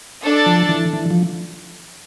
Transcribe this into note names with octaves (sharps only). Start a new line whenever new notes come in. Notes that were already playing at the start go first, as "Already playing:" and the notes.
D4 A4 D5 A5
F3
E3
E3
F3